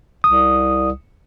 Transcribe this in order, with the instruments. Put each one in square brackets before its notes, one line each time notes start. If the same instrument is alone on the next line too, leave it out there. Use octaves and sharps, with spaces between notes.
[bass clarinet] C2 [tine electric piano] D#6